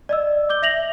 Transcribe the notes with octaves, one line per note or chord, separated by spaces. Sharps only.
D5 D#5 E6
D6 G6 G7
E5 A#6 F7 F#7